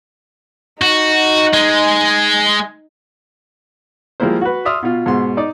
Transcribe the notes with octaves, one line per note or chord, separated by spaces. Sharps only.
D#4 F#4
G#3
F3 G3 G#3 A#3 E4 C5
F#4 B4
D5 E5 C6 D#6 F6
B2 F4
G#2 B2 C6
D#4 D5